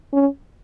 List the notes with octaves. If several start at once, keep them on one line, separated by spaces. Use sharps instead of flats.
C#4